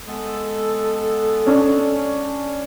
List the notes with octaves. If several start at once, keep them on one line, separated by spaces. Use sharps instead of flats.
G#3 B3 A4
C#4 D4